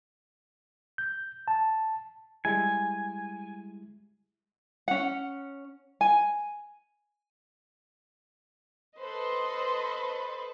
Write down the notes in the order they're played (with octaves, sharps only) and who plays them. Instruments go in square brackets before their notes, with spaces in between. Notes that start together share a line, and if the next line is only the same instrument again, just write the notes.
[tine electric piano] G6
A5
[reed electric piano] G3 G#3 E4 [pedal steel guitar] G#5
[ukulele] C#4 F#5
G#5
[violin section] A4 B4 C5 [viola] D#5 C6